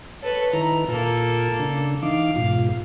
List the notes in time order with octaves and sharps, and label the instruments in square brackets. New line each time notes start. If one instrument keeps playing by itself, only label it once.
[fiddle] A4 B4 [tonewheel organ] C#5
[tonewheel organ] D#3 E4 B4 [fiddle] A#5
[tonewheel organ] A#2 F4 [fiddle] A#3 A4
[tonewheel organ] C#3 D4
[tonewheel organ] E3 D#4 D6 [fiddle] F5
[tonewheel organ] G#2 B2 F4